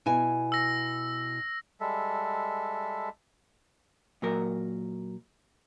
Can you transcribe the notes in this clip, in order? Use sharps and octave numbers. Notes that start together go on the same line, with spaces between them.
B2 E4 G#5
E6 A#6
G3 G#3 A4 E5
A#2 F#3 A#4